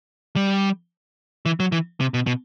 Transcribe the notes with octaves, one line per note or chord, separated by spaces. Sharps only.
G3
E3
F#3
E3
C3
B2
B2